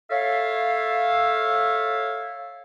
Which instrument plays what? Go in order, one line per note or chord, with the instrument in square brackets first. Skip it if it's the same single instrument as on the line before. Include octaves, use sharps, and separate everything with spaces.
[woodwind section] A4 C#5 E5 F5